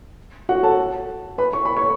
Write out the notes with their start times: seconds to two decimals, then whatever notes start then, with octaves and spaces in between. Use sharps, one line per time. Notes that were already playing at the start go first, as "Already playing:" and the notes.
0.49 F#4 F#5
0.63 A4 A5
1.38 B4 B5
1.53 C#6
1.65 B5
1.77 C#5 C#6